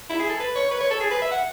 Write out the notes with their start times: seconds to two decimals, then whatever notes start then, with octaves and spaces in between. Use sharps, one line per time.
0.09 E4
0.19 G#4
0.29 A4
0.40 B4
0.56 C#5
0.71 B4
0.80 C#5
0.91 A4
1.00 G#4
1.11 B4
1.22 E5
1.31 F#5